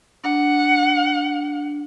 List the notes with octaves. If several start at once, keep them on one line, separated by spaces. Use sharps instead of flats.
D4 F#5